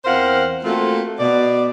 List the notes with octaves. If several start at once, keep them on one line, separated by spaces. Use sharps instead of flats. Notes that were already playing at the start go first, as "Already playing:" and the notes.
E2 C4 A#4 C5 F5 F#5
A3 A#3 C4 F4 F#4 A4
B2 D5